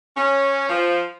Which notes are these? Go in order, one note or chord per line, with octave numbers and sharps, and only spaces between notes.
C#4
F3